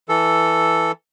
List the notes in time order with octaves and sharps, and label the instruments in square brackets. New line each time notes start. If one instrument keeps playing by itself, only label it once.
[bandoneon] E3 A4